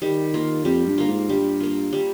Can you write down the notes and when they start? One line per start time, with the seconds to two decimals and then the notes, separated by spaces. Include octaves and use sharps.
0.02 D#3 G3
0.34 A#3 F4
0.65 F2 G3
0.87 G2
0.98 A#3 F4
1.08 G#2
1.29 G2 G3
1.60 A#3 F4
1.93 G3